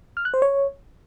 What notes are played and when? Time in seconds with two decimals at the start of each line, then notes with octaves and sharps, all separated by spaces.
0.17 F6
0.25 F#6
0.34 C5
0.42 C#5